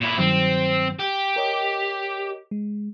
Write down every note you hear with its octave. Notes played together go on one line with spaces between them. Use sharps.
A#2 E4
G2 D#3 F#3 C4
G4
A#4 C#5 D#5
G#3